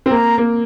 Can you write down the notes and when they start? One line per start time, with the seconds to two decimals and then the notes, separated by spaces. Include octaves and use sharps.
0.06 C4
0.11 A#3 A#5
0.38 A#3